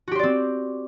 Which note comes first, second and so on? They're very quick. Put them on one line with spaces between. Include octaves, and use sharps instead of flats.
F#4 G4 C5 D5 C4